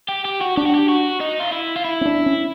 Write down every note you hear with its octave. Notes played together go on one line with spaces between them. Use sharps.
G4
G4
F#4
D4 G4
F#4
G4
F#4
D#4
F4
E4
F4
E4
C#4
D4
C#4